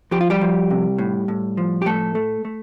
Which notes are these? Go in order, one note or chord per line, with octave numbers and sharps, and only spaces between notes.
F3 G4
F4
G3 G4
F3
C3
A2
A2
F3
G4
A2 A3 A4
A3
A3